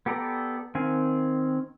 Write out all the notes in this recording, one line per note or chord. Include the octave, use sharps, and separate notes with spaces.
B3 G4 A4 D5 A#5
D#3 C4 F5 G#5